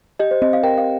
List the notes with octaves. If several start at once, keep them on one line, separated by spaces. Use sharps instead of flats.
G4 D#5
C5
C4 D#5
F5
A#4 G5
F5